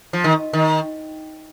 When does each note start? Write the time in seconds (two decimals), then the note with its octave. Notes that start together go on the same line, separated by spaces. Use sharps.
0.13 F3
0.24 D#3
0.53 D#3